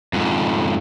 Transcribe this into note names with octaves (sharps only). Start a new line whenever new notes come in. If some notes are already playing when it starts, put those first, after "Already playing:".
F2 G#2